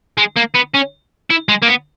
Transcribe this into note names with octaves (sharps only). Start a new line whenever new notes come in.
G#3
A#3
B3
C#4
E4
G#3
A#3
B3